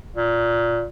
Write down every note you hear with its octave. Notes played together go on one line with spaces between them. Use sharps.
A#2